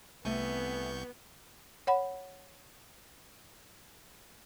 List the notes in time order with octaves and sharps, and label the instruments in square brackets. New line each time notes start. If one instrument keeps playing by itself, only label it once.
[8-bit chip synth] C2 C#6 G6 [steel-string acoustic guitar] C3 A3 G#5 [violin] B3
[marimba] C#5 F#5 B5